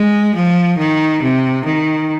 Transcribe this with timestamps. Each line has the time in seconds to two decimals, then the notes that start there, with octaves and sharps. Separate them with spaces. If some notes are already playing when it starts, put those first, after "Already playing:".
Already playing: G#3
0.35 F3
0.78 D#3
1.22 C3
1.65 D#3